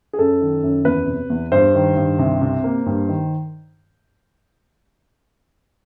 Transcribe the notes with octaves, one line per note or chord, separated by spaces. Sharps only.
G#4
F#2 A4
D#3
F#2
E2 B4
C3
E2
G2 C5
D#3
G2
C2
C3
A#3
G2
D#3